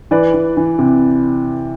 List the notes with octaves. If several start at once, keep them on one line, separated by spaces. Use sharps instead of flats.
E3 B4 D5
E3
E3
C3